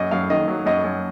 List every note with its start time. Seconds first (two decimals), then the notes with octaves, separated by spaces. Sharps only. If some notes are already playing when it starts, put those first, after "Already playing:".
Already playing: F#2 D#5
0.11 F#2 F5
0.30 D#3 D#5
0.48 F#3
0.66 F#2 D#5
0.84 F#2